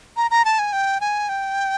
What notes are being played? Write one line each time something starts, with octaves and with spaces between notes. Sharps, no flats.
A#5
A#5
A5
G#5
G5
G#5
G5